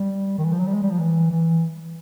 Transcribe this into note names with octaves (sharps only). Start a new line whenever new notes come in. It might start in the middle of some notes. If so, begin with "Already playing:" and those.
Already playing: G3
D#3
E3
F3
F#3
G3
G#3
G3
F3
E3
E3